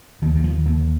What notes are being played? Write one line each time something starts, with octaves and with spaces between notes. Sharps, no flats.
D#2 D#3
D#3
F3
D#2 D#3